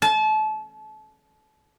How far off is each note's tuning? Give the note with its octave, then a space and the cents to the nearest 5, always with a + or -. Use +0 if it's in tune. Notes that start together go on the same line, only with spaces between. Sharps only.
A5 -30